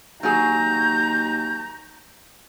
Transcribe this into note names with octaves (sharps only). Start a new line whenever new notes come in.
D#2 F#3 F#4 G#4 A#5 G6